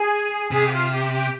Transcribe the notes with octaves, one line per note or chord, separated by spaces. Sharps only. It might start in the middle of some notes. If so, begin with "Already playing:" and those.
Already playing: G#4
C3 G#4
G4
F4
G4
G4